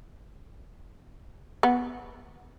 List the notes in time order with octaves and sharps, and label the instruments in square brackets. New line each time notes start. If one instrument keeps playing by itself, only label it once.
[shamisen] B3